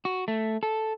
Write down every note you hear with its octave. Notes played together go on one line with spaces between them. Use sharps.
F#4
A3
A4